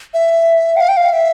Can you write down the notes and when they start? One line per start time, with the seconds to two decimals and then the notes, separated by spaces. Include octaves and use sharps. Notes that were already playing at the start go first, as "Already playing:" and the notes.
0.14 E5
0.76 G5
0.80 F5
0.88 G5
0.97 F5
1.12 E5